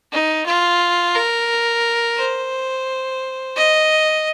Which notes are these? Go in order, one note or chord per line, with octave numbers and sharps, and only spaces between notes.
D#4
F4
A#4
C5
D#5